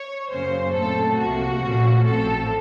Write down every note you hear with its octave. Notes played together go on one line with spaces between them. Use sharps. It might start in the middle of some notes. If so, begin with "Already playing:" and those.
Already playing: C#5
F#2 C#3 F#3 A#3 C#4 C5
A#2 A3 C4 A4
C2 C3 F3 A#3 F#4
A#1 A#2 F3 A3 C#4
A1 A2 F3 C4 A4